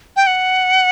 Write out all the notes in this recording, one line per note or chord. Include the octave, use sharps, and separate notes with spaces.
G5
F#5